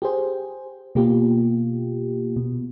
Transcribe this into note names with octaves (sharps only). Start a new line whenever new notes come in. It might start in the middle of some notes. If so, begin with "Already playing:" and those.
G4 G#4 C5
B2 A#3 F4 G4
B2